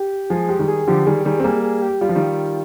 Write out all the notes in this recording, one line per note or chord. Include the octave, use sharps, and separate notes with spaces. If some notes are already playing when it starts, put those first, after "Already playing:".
Already playing: G4
F3 G#3 G#4
G#3 G4
D#3 G3
G#4
D3 F3 G4
D#3 G3 G#4
D#3 G3 G#4
C4
G3 A#3 G#4
G#4
G4
G3 F4
F3
D#3 G3